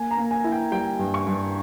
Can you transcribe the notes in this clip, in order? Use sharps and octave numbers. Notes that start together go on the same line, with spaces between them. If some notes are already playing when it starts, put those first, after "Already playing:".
Already playing: A#3 G#5
A#5
A#3
G#5
E4
G5
G3 G5
G2
C#6
G2